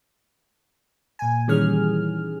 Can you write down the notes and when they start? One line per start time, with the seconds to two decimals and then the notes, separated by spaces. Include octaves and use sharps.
1.19 A#2 G#5
1.48 D#3 E3 G3 C#4 G#4 F6